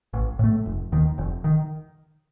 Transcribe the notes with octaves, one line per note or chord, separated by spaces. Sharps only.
A1
A2 A3
F1
D#2 D#3
F1
D#3